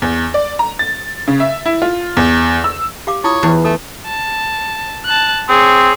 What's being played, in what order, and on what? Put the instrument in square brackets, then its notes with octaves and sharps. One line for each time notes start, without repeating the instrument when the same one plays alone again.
[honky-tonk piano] E2
D5
A#5
A6
C#3
E5
E4
F4
E2
E6
[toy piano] G4 F5 D6
[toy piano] E4 F4 D#6 [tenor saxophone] C#5
[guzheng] E2 [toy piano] E4 B4
[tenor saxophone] A3 [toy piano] A4
[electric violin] A5
A5 F#6
[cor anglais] C4 [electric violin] G#4 C#5